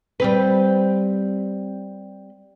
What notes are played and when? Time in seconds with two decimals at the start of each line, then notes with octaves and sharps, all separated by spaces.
0.20 G3 C4 B4